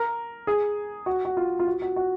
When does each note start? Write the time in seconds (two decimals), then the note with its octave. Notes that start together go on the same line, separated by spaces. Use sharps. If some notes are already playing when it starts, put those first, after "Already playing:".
Already playing: A#4
0.47 G#4
1.06 F#4
1.25 F#4
1.37 F4
1.59 F4
1.67 F#4
1.82 F#4
1.96 F#4